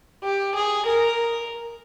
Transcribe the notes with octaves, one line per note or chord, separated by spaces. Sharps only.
G4
G#4
A#4